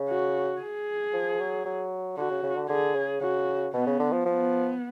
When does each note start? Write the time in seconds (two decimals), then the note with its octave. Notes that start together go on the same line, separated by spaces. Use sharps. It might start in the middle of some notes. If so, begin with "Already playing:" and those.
Already playing: C#3
0.09 F#4
0.61 G#4
1.13 F3
1.40 F#3
1.66 F#3
2.17 D3 F#4
2.31 C#3
2.43 C#3
2.57 D3
2.69 D3 G#4
2.96 C#3
3.21 C#3 F#4
3.74 B2 B3
3.87 C#3
4.00 D3
4.13 F3
4.26 F3 B3